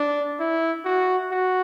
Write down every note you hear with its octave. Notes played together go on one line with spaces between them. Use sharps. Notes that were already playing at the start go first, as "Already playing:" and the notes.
Already playing: D4
E4
F#4
F#4